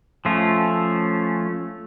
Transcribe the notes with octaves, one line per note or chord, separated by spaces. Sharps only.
F3 A3 C#4 F4